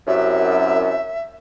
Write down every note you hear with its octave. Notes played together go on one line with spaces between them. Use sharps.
C2 F#2 E5